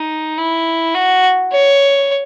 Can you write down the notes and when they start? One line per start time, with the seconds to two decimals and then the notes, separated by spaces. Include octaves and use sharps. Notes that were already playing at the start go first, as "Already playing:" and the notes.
Already playing: D#4
0.38 E4
0.95 F#4
1.53 C#5